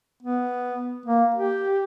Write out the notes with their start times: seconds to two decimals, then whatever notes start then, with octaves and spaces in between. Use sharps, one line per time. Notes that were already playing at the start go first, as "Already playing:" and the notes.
0.23 B3
1.06 A#3
1.34 G4